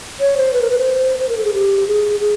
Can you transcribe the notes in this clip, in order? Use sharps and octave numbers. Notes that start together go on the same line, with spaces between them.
C#5
C5
B4
A#4
B4
C5
C5
A#4
A4
G#4
G4
G#4
G#4